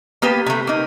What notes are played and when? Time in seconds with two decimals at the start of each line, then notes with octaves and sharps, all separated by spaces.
0.22 A#3 B3 G4 B4
0.46 C3 A3
0.67 A#3 D#4